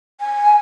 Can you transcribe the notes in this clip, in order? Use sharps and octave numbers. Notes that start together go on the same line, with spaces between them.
G#5